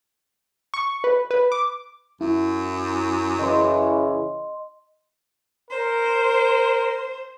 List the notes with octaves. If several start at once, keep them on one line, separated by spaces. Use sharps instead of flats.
C#6
B4
B4
D6
F#2 E4
C#3 E3 D#5 C6
A#4 C5